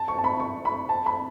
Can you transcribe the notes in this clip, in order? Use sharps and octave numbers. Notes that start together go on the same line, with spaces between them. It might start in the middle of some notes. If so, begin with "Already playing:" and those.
Already playing: A5
C#6
A5
B5
C#6
B5
A5
B5